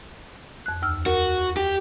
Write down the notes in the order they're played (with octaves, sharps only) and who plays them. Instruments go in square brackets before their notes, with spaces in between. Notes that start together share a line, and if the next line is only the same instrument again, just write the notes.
[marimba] F2 F#6
D#2 E6 F6
[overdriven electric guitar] F#4 [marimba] A#4
[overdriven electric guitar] G4